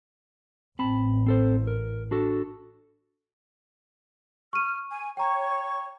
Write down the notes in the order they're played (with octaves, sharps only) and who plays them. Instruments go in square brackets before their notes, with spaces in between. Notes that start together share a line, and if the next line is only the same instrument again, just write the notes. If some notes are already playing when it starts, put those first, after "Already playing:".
[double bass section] A1 [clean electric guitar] C4 A5 B5
[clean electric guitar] C4 A4 C5
A#4
D4 F#4 A4
[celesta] C#6 D#7 [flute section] F6
[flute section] G#5
[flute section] C#5 C#6 [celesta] G5 A#5